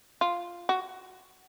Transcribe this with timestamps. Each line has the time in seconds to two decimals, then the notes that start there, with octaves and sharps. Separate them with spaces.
0.21 F4
0.69 F#4